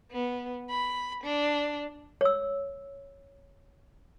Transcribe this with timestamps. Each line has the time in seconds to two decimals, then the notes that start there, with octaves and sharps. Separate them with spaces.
0.12 B3
0.70 B5
1.24 D4
2.21 C#5 E6